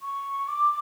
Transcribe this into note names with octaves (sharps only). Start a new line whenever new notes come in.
C#6
D6